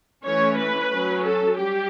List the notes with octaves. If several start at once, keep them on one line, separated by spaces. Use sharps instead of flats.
E3 A3 C#4 C#5
B4
F#3 C#4
A4
G3 G4